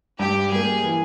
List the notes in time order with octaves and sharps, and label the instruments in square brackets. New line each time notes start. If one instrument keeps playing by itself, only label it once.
[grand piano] G2 [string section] G4
[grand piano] G3 A#3 [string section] G#4
[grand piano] E3